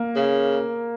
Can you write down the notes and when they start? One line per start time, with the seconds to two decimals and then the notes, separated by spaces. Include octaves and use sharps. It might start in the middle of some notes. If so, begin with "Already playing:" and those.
Already playing: A#3
0.16 C#3